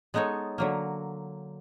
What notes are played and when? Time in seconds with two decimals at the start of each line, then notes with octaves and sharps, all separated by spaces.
0.14 G#3 B3 D#4 A4 C#5
0.58 D3 F#3 A#3